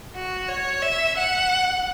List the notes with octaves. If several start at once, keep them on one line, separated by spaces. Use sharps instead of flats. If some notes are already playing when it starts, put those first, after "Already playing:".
F#4
C#5
E5
F#5